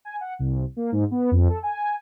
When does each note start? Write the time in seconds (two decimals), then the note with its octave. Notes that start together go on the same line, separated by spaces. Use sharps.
0.05 G#5
0.21 F#5
0.39 C2
0.77 A#3
0.92 G#2
1.11 B3
1.31 F2
1.49 A4
1.63 G#5